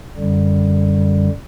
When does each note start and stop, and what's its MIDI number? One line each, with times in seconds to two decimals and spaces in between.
0.17 1.29 42
0.17 1.29 50
0.17 1.29 55